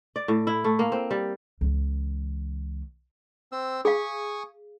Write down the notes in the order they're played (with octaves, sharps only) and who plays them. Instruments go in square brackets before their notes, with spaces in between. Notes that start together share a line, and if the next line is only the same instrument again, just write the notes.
[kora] D5
A2
E4
A3
A#3
C4
G3
[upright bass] C#2 E3
[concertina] C4 E6
[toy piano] G#4 F5 [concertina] G#5 C#6 D#6